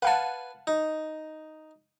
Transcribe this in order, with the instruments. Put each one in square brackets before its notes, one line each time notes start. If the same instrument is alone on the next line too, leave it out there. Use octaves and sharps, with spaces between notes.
[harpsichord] B4 G#5 [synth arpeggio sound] F5 F#5 A5
[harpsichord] D#4